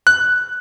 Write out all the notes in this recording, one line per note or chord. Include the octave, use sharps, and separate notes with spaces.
F#6